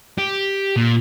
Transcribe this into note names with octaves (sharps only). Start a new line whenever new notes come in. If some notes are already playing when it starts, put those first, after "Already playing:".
G4
A#2